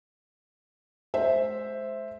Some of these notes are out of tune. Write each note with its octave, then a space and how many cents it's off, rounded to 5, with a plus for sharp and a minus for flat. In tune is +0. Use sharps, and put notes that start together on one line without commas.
G#3 +40 C5 +0 E5 +0